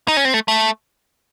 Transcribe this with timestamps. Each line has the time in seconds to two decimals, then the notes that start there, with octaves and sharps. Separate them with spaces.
0.08 D#4
0.17 C#4
0.25 C4
0.34 A3
0.48 A3